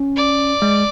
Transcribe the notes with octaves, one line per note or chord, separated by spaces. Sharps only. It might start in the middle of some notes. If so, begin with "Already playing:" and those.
Already playing: C#4
D5
G#3